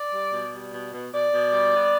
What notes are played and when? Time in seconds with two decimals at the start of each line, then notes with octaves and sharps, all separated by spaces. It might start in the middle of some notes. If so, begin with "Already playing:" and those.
Already playing: D5
0.13 G3
0.33 B2
0.53 G3
0.73 B2
0.93 B2
1.12 B2 D5
1.32 B2
1.52 G3
1.73 B3